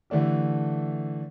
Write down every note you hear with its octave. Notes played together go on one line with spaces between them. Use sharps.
D3 E3 A3 D4 G4